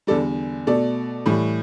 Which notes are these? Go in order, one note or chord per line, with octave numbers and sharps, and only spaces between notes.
E2 D3 G3 A4 D5
B2 A3 A4 D5
A2 E3 G3